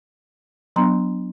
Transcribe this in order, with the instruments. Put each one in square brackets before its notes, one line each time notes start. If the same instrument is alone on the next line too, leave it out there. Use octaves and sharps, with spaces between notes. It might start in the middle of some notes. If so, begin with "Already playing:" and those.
[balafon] F#3 B3 D4 A#5 C6